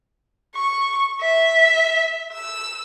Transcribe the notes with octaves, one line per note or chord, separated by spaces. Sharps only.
C#6
E5
E6